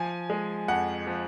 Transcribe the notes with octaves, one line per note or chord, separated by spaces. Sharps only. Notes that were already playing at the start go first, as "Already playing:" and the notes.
Already playing: F3 G#5
G#3
F2 F#5
F3